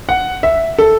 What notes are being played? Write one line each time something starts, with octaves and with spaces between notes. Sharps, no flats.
F#5
E5
A4